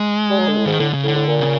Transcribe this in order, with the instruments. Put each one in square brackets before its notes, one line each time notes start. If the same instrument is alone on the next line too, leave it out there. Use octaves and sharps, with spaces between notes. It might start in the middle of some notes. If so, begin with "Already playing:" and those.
Already playing: [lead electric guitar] G#3
[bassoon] G3
F#3
D3
A2
[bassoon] G#2 [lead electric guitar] D#3
[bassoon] A2 [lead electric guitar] D3
[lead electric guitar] C#3
[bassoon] A2
[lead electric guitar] D3
[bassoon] A2
A#2
[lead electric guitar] C#3